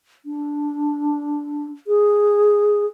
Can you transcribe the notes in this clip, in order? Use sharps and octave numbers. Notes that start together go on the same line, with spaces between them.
D4
G#4